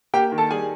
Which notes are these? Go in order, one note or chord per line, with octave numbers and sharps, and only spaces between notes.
A#3 G4 G5
D#3
A4 A5
G3 G#4 G#5